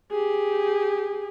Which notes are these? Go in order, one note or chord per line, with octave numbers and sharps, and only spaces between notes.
G4 G#4